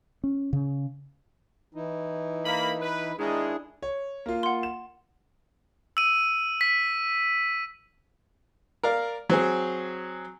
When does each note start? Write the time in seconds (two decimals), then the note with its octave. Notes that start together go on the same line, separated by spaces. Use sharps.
0.24 C#4
0.53 C#3
1.74 E3 D#4 E4
2.45 A#3 B5
2.80 B4
3.18 G#2 D#3 G#3 D4 E4 G#4
3.82 C#5
4.26 A#3 F4
4.43 F#5 C6
4.63 E7
5.97 E6 D#7
6.61 B6
8.83 A#4 D5 F5
9.29 F#3 C4 G#4